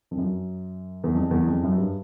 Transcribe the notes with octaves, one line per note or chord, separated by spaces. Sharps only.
F2
F#2
E2
F2
E2
F2
F#2
G2